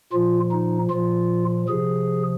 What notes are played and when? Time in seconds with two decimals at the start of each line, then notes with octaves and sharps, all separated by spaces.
0.13 A#2 F3 F4
0.52 D#4
0.90 A#2 F3 F4
1.69 C3 F3 G#4